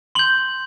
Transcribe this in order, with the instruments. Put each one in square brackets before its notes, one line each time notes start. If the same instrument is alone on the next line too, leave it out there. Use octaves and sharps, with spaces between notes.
[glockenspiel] C6 G6 F#7